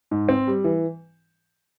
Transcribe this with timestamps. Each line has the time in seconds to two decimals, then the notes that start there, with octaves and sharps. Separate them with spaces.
0.11 G#2
0.29 C4
0.47 G3
0.64 E3